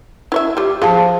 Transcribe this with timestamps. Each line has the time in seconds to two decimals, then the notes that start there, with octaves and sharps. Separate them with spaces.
0.32 E4 C#5 E5
0.57 G3 F4 G4
0.82 F3 F4 G#4 F5 A5